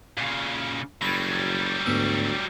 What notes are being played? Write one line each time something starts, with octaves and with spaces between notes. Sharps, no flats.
A#2 C#3
F#1 F#3 G3 B5 G#6 A6
D2 G#2 B3 E6